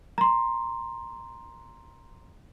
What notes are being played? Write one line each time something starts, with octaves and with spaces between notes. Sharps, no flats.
A#5 C6